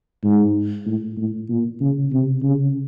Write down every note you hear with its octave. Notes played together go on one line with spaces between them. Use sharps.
G#2
A2
A2
A#2
C#3
C3
C#3